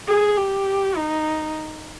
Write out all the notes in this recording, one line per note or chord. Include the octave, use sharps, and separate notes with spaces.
G#4
G4
D#4